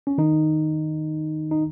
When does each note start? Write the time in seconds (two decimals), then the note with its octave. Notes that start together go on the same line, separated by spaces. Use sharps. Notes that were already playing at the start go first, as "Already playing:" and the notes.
0.07 C#4
0.18 D#3 D#4
1.51 D#4